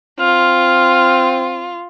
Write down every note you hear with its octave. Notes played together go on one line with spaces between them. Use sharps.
C4 F4 F6